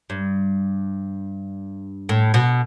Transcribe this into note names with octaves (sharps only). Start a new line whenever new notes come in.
G2
A2
B2